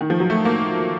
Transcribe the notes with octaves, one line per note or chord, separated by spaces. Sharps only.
D#3
F3
F#3
A3
A#3